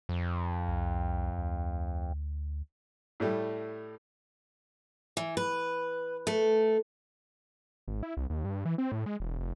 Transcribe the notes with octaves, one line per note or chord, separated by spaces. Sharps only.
F2
C2
D2
A2 G3 A3
E3
B4
A3
G#1
E4
C2
D#2
G2
E3
C4
A2
G#3
E1
F1